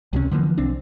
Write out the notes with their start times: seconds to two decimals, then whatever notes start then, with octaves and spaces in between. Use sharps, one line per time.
0.13 C#2 C3 E3 C#4
0.31 D3 E3 F3 A#3
0.57 B1 C4 D4